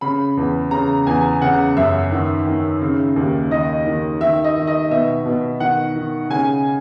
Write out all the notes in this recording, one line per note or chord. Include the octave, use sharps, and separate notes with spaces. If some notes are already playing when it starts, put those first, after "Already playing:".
C#3 B5
E2
C#3 A#5
E2 G#5
C#3 F#5
F#2 E5
D#3
D#3
C#3
D#2
D#3 D#5
D#3
D#3 E5
D#5
D#3
D#5
B2 E5
B2
D#3 F#5
D#3
C#3 G#5